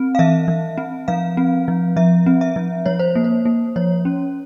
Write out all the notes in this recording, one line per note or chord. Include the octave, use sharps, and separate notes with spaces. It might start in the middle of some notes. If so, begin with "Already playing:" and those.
Already playing: C4
F5
E3 E5
E3
C4
F3 F5
C4
F3
F3 E5
C4
E5
F3
F3 C#5
C5
A#3
C5
A#3
F3 C#5
C#4